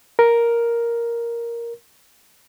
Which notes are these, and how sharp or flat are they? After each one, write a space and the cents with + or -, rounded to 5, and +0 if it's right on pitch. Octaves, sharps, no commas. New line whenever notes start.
A#4 +5